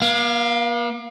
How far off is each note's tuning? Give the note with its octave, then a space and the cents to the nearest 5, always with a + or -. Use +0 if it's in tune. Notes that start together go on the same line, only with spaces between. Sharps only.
A#3 +45 F5 +0